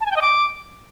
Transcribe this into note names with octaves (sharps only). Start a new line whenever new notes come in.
A5
G#5
G5
D#5
D6